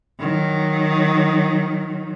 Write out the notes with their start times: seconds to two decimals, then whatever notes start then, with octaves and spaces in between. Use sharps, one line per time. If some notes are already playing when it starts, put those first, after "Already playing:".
0.19 D#3 F#3